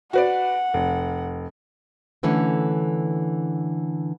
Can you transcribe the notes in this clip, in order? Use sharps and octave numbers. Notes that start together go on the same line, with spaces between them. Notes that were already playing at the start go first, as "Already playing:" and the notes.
F#4 B4 D5 F#5
F1
D3 E3 A3 C#4